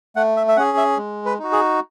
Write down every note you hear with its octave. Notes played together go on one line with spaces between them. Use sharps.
A3 F#5
E5
E5
C#4 G#4 F#5
E5
G#3
B4
D#4 F#4
G#4